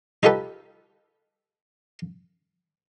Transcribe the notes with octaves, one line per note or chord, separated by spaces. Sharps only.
D#4 F4 G4 A4 B4